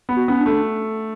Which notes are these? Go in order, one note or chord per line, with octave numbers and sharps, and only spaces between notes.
B3
F#4
B3 C#4
D4
A3